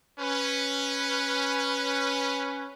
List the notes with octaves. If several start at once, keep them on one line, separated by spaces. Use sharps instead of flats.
C#4 B4